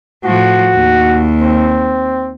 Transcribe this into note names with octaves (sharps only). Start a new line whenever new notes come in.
A2 F3 F#4
D#2
C4